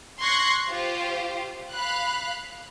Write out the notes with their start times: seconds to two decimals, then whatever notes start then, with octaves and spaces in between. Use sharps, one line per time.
0.21 C6 C#6 F#6 G#6 A#6 C7
0.69 F4 G4 C5 F5
1.73 F5 B5 F#6